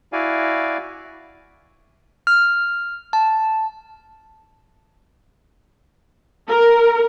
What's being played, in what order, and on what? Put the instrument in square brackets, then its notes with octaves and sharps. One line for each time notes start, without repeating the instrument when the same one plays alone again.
[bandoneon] E4 F#4 D5 F5 G#5
[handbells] F6
A5
[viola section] A#4